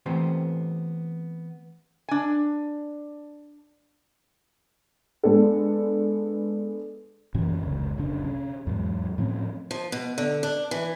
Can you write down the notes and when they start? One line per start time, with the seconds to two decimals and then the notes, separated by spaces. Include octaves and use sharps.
0.06 E3 A3 B3 C4 G4 C5
2.09 D4 G#5
5.23 G#3 B3 D4 A4
7.34 F#2 A#2 E3 C#4
7.62 F1 C#2
7.97 F1 B1 C#3 D4
8.25 C3 C#4
8.67 E2 G#2 F#3
9.18 A2 F3 C4 C#4
9.71 F3
9.92 B2
10.18 D3
10.43 D4
10.71 E3